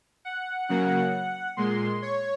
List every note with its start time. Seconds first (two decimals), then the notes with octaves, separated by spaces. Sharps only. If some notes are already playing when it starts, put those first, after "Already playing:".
0.25 F#5
0.68 C#3 F#3 A#3 F#5
1.57 A#2 G#3 C6
2.02 C#5